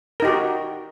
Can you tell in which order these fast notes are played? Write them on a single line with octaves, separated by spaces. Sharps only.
A#4 D#4 G4 F#4